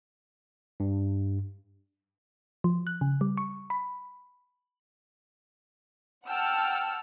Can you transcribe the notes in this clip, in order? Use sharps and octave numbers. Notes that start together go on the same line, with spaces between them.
G2
F3
F#6
C#3
G3
C#6
B5
F#5 G5 A5 E6 F6